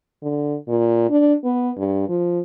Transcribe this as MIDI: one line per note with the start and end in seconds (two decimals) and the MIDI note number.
0.23 0.56 50
0.68 1.08 46
1.10 1.34 62
1.44 1.71 59
1.77 2.05 43
2.09 2.40 53